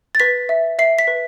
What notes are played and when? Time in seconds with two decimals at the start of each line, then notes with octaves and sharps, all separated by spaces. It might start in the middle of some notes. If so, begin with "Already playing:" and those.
0.15 A6
0.20 B4 B6
0.49 E5
0.79 E5 C7
0.99 B6
1.07 B4